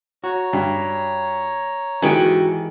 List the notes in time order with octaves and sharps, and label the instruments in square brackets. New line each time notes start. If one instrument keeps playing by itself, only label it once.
[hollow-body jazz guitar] F#4 [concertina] C#5 A#5
[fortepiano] G2
[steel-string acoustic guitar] G#2 F#4 G5 [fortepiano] D#3 G#5 [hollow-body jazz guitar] E3 G#3 G4